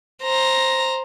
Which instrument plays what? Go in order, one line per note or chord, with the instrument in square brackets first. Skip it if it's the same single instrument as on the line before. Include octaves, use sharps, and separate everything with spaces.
[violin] C5 A#5